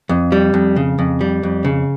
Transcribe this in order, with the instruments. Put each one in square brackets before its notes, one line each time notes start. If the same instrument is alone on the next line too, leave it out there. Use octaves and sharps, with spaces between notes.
[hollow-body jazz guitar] F2
G3
F2
C#3
F2
G3
F2
C#3